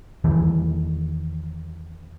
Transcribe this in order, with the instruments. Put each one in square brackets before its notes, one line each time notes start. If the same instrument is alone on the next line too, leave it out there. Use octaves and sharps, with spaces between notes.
[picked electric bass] E2 D#3 E3 G3